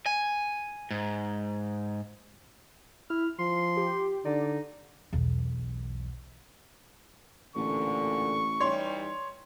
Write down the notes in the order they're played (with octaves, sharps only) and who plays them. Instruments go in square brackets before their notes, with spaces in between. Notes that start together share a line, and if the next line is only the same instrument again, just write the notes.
[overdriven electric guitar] G#5
G#2
[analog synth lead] E4 [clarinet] F6
[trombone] F3 [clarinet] C6 [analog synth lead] C7
[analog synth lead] G4
[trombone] D3 [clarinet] D#4 [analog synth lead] D5
[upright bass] B1 E2
[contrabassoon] A1 [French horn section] D2 A#2 D3 [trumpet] C#6
[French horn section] E3 G3 D#4 [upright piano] C#5 C6